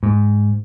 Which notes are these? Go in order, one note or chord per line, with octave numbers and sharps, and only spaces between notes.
G#2